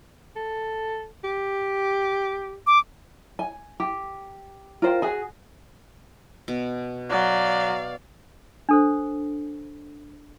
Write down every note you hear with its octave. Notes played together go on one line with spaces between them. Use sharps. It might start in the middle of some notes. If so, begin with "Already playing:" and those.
A4
G4
D6
G#5
G4
F4 A#4 C5 G5
F#4 G#4 G#5
B2
F#3 D5 F5
D4 A4 C5